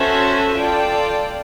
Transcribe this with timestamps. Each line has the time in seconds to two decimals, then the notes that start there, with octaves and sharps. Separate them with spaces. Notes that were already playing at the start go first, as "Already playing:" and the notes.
Already playing: C#4 F#4 A4 C5 E5
0.57 F4 A4 D5 G5